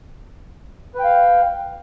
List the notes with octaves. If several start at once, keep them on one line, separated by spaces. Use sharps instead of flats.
B4 F5 G5